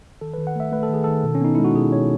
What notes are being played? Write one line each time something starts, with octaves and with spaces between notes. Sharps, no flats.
D#3 A4
D#3 B4
F#5
A3 E5
A3 B4
A4
D#3 G#4
D#3 A4
B2
C#4
B3 D#4
G#3 E4
F#4
B2 G#4
B2 C#5